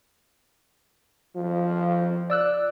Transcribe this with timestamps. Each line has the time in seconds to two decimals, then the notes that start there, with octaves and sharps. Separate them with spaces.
1.35 F3
2.30 D5 E6 F#6